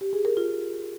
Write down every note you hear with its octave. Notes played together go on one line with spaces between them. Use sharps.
G4
G#4
A#4
F4